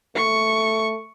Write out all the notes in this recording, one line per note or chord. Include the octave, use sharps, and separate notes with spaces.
A3 C#6